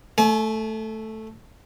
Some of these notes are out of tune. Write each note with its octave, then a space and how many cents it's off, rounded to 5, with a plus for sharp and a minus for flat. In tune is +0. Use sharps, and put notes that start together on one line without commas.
A3 +0 G#5 +45